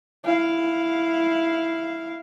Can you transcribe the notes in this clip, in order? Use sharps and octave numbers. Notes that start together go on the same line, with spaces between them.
E4 F5